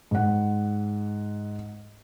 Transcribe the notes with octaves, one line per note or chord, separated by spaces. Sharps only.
G#2 F#5